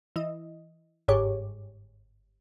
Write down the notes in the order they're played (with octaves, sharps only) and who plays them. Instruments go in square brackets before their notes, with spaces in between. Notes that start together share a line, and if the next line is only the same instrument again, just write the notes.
[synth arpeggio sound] E3 E4 D#5
G1 G#2 G4 G#4 C#5 D6